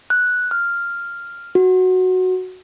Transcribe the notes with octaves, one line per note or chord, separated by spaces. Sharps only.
F#6
F6
F#4